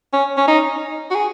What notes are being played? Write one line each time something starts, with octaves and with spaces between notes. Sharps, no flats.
C#4
C#4
D#4
F#4
G#4